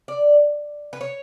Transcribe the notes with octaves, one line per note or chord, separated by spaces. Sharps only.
D5
B4
C#5